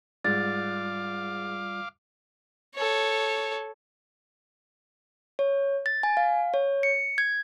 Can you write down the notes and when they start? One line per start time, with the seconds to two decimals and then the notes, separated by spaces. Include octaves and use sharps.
0.24 G#2 G3 F4 D5 F5 D6 A6
2.75 A4 C#5
5.39 C#5
5.86 A6
6.03 G#5
6.17 F5
6.54 C#5
6.83 C#7
7.18 G#6